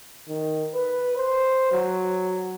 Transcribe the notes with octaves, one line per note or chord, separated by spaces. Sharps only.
D#3
B4
C5
F#3